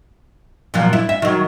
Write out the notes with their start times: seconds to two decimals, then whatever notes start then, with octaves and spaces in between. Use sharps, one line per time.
0.74 A#2 F3 F#3
0.93 E4
1.09 E5
1.22 D#3 F#3